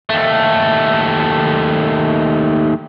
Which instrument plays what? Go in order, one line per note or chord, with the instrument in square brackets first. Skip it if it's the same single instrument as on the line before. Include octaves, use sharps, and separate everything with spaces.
[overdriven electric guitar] D#2 A3